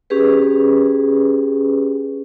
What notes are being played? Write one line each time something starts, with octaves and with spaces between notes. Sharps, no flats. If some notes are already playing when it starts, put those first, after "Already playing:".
C#4 G4 G#4 B4